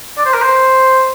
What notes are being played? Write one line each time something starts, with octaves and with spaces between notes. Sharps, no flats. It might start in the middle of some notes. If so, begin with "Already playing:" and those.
D5
C5
A#4
C5